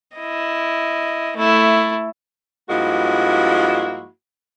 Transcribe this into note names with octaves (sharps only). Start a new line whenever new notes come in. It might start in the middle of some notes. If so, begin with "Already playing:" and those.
E4 D#5
A3 E4
G2 F3 G#3 A#3 E4 F#4